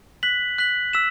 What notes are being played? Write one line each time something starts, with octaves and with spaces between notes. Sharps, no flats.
F#6 B6 F#7
F#6 B6 F#7
E6 B6 E7